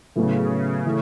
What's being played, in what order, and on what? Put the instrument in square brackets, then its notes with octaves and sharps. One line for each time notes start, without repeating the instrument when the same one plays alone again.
[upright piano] A2 F#3 B3 E4 [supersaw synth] C#3
[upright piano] E3 A3